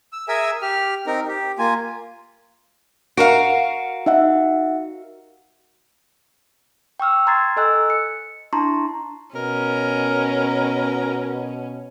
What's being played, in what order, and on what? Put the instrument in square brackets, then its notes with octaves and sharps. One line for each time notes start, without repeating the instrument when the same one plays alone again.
[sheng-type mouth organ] E6
G#4 A#4 E5 G#5 E6
G4 F6
C4 D#4 A#4
G4
A#3 F4 G#5
[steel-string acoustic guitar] F#4 A#4 F5 [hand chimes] D7
[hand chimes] D#4 E5 F#5
G5 C#6 E6 F6
A#5 C6 G#6 A6 C7
A4 D#5 G#5 E6 F#6
C#7
D4 E4 A5 A#5 C6 C#6
[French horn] B2 [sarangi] C#4 [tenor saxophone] A#4